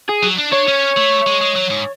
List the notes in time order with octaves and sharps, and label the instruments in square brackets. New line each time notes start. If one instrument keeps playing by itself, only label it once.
[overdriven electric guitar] G#4
[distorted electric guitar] F#3
D4
[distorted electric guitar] D4 [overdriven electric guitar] C#5
[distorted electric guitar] C#4
A3
G#3
G#3
F#3
G#2